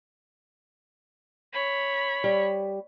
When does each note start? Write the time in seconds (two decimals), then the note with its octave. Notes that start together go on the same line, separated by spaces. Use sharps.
1.53 C#5 B5
2.24 G3